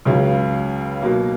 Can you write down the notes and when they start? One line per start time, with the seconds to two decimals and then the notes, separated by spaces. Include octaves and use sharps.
0.05 C#2 C#3 F#3
1.02 B2 F#3 A#3